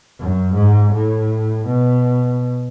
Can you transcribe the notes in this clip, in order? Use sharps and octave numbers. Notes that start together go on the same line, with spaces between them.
F#2
G#2
A2
B2